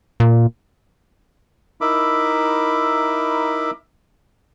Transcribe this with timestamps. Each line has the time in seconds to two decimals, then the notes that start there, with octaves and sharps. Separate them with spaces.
0.20 A#2
1.81 D#4 E4 A#4 E5 B5 D6